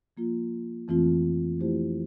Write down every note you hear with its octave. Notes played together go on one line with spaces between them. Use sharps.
F3 A#3 F4
F2 E3 A3 C4 F4
F3 A3 E4 G4 C5